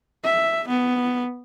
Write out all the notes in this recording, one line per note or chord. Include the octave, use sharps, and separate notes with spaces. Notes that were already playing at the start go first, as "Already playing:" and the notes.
E5
B3